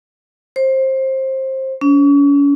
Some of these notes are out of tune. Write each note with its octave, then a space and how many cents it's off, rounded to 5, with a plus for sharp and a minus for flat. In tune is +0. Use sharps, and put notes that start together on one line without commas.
C5 +20
C#4 +40